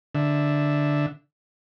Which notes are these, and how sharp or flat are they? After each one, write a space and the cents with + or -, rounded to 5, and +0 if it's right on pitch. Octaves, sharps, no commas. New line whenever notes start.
D3 +0 E5 +0